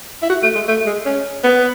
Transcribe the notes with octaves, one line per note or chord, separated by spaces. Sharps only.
E4
F#4
A3
G#3
A3
G#3
C#4
B3